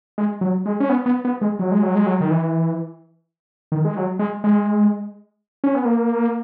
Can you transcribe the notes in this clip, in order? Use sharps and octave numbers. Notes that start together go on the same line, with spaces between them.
G#3
F#3
G#3
C#4
B3
B3
B3
G#3
F#3
G#3
F#3
G#3
F#3
D#3
E3
D#3
G#3
F#3
G#3
G#3
C#4
B3
A#3